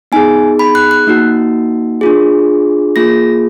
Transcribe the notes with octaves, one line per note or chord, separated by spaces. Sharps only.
B3 D#4 G#4 G#5
B5
F#6
F#6
A#3 D#4 F#4
D4 F4 G#4
A#3 F4 G#4 A#6